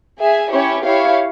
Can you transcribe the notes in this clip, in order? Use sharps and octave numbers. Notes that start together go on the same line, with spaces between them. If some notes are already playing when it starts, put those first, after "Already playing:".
G#4 E5 G#5
C#4 E4 G4 C#5
E4 G4 C#5 F5